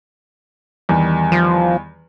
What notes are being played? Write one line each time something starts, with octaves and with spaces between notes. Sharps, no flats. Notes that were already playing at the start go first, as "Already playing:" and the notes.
E2 D#3 G3
F3